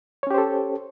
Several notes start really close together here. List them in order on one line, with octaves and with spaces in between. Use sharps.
C#5 C#4 G4 C5 A4